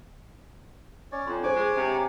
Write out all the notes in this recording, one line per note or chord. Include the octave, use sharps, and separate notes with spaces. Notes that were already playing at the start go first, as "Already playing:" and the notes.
C#4 C#5 D5
F2 C6
D4 G#4 C5 C#5 G#5 D6
G#3
C3
G5 A#5